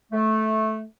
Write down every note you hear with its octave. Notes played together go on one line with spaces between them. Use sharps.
A3